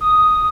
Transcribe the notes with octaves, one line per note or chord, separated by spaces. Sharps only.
D#6